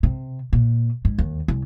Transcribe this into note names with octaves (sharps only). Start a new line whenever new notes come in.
C3
A#2
G#2
D#2
C2